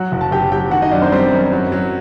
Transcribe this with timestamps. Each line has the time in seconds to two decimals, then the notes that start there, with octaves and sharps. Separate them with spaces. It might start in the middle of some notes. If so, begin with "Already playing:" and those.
Already playing: F#3 F#4 F#5
0.12 F#1
0.21 A5
0.31 F#1 G4 G5
0.52 F#3 G4 G5
0.71 D#3 F#4 F#5
0.82 D#4 D#5
0.92 F#2 D4 D5
1.02 C4 C5
1.12 G3 C4 C5
1.32 F#2
1.52 F#3
1.72 F#3